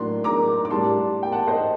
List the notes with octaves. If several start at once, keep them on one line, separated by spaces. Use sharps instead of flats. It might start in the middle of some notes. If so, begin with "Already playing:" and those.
Already playing: A2 F#3 A#3 D4 C6
A#5 D6
D6
A2 G3 D4 A5 C6
G5
F#5 A5
C5 D#5